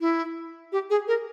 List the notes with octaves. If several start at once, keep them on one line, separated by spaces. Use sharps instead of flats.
E4
G4
G#4
A#4